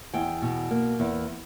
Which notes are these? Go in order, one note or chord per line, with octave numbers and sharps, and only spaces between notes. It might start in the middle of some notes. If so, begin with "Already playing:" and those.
E2 G5
B2
A#3
E2